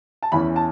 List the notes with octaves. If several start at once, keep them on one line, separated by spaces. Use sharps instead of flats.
A5
E2 E3 C#4 B5
A5